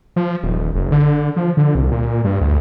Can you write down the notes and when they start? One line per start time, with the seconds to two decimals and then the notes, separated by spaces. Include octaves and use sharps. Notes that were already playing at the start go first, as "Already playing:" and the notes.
0.16 F3
0.43 D#1
0.75 F#1
0.92 D3
1.36 F3
1.57 D3
1.75 C2
1.92 A#2
2.24 G2
2.41 D2